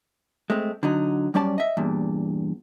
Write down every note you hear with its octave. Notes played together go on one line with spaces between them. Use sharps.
G#3 A3 C4
D3 F#3 D#4
F#2 G3 C#4 D5 A5
D#5 E5
E2 G2 A#2